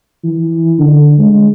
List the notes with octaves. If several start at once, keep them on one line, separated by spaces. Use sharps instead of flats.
E3
D3
G#3